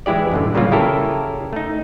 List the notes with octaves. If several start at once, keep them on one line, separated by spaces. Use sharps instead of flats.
E3 G#3 E4 G4 D5
F#2 A2 D3
A#2 C#3 F#3 G3 A#3 F4
C#3 E4 G4 A4 A#4
A3 D#4